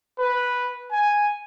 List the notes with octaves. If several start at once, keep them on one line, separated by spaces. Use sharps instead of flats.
B4
G#5